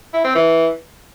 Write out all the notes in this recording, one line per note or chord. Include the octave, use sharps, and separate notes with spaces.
E4
C4
E3